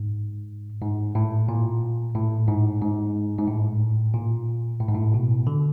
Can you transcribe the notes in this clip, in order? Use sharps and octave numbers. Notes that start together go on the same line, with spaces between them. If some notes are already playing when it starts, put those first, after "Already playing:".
Already playing: G#2
G#2
A2
A#2
A2
G#2
G#2
G#2
A2
A#2
A2
G#2
A2
B2
D3